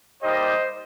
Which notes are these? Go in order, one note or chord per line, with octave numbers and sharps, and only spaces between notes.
G3 A#3 D#4 G4 C5 D#5